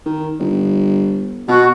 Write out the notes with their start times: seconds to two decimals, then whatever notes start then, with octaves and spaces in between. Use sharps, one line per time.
0.06 D#3
0.39 G1
1.48 B2 F#4